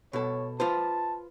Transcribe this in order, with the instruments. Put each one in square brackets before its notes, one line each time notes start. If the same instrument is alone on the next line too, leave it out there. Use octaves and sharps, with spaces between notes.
[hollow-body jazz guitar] B2 A4 [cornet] C#5
[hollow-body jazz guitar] F4 B4 C5 [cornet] A5